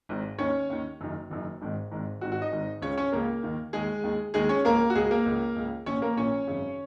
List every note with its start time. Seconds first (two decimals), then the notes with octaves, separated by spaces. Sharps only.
0.09 G#1 G#2 D#3
0.38 D#2 D#3 C#4 C#5
0.70 D#2 D#3
1.00 F#1 F#2 D#3
1.31 F#1 F#2 D#3
1.61 G#1 G#2 D#3
1.91 G#1 G#2 D#3
2.21 G#1 G#2 D#3 F#4
2.32 F#4
2.41 D#4 D#5
2.51 G#1 G#2 D#3
2.82 C#2 C#3 C#4 C#5
2.98 C#4 C#5
3.12 C#2 C#3 A#3 A#4
3.43 D#2 D#3
3.73 D#2 D#3 G#3 G#4
4.03 D#2 D#3
4.34 D#2 D#3 G#3 G#4
4.49 C#4 C#5
4.64 C#2 C#3 A#3 A#4
4.90 F#4
4.95 C#2 C#3 G#3 G#4
5.11 A#3 A#4
5.26 C#2 C#3
5.56 C#2 C#3
5.86 A#1 A#2 C#4 C#5
6.02 A#3 A#4
6.17 A#1 A#2 C#4 C#5
6.47 G#1 F#2 C#3